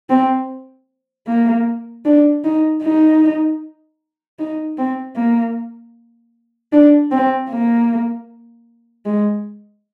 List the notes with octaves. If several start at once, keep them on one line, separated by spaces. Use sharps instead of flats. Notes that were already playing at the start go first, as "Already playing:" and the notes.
C4
A#3
D4
D#4
D#4
D#4
C4
A#3
D4
C4
A#3
G#3